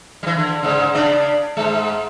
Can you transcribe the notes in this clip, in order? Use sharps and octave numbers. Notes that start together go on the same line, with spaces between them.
E3 G3
D3
G#2 C#3
C#3 D4 D5
G#2 G#3